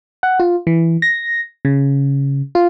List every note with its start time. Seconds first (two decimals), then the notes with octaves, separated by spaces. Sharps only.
0.23 F#5
0.40 F4
0.67 E3
1.02 A#6
1.65 C#3
2.55 F4